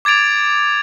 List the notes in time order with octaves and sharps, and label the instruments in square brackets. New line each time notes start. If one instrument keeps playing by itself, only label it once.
[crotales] D6 G#6 A6 D7 F7